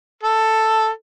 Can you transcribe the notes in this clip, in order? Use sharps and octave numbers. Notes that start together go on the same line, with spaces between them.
A4